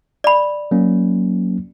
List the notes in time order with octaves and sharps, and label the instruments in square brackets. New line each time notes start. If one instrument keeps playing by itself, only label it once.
[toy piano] D5 B5
[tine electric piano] F#3 A#3 C#4